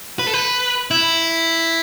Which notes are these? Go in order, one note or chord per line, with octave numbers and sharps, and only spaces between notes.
B4
A4
B4
E4